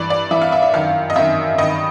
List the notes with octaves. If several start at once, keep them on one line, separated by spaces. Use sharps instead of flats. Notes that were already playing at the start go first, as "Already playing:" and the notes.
Already playing: G2 E3 D5
D5
G2 E3 E5
F5
E5
E5
F#2 D#3 F5
D#5
F#2 D#3 E5
G2 D#3 D#5